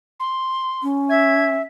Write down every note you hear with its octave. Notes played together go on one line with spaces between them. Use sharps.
C6
C#4
E5 G#6